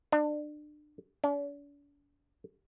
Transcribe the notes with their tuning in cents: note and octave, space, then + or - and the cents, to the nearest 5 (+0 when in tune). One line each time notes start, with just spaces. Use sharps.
D4 +30
D4 -45